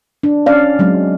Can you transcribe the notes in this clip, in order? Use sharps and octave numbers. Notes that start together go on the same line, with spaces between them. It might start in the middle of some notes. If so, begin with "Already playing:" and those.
D4
C#4 D5 F5
F#3 G#3 C4